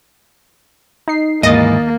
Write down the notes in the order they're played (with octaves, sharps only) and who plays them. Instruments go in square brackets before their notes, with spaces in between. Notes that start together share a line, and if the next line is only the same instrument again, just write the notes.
[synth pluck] D#4 C7
[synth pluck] D#2 A6 [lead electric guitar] G#2 E3 [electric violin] A#3 [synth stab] D#5